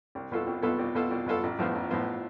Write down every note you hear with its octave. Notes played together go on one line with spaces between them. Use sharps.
C2
B2 B3 F4 A4
C2
B2 B3 F4 A4
C2
B2 B3 F4 A4
C2
B2 B3 F4 A4
A1
A2 F3 B3 F4
A1
A2 F3 B3 F4